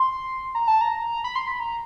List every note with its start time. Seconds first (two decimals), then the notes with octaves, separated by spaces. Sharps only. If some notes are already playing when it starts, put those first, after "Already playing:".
Already playing: C6
0.55 A#5
0.68 A5
0.81 A#5
1.24 B5
1.36 C6
1.47 B5
1.60 A#5